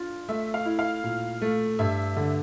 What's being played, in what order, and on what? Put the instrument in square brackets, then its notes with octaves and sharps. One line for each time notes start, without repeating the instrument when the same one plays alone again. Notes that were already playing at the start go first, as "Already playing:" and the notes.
Already playing: [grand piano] D4 F4
[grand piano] A3 [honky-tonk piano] E5
[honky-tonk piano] F5
[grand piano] E4
[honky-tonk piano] F5
[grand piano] A#2
A3
[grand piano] G2 [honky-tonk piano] E5
[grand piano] D3